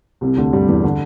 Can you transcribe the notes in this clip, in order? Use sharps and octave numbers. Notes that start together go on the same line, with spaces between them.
C2 C3
D2 D3
G2 G3
E2 E3
D3